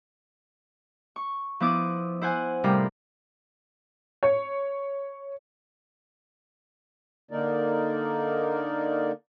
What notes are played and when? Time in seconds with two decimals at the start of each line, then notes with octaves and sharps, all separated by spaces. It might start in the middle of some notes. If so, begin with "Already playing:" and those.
1.16 C#6
1.60 F3 B3 E4 D6 D#6
2.21 E4 C5 F#5 G#5 F#6
2.64 A2 C3 G3 F4 A#4 B5
4.23 C#5
7.31 D3 A#3 D#4 A#4 D5